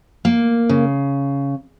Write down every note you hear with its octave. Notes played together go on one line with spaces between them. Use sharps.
A#3
C#3